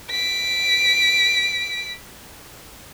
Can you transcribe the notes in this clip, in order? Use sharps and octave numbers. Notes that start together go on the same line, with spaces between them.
B6 D7